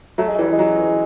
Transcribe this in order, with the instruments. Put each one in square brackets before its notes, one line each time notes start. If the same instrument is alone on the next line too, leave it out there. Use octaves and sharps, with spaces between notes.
[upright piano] F#3 [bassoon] A3
[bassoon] G#3
[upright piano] E3 [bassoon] G3
[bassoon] G#3
[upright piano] F#3
E3